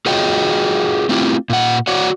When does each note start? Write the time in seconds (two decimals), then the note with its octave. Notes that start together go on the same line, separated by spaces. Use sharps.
0.06 F4 F#4 G#4 C#5 D#5 G5
1.09 A3 C4 E4 F4 G4
1.50 A#2 F#5
1.87 F#4 C#5 D5 F#5